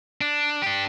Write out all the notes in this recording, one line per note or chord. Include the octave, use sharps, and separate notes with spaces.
D4
D4 G4